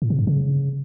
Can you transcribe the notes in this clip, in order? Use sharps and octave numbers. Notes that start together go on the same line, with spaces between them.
A2
C3
G2
C#3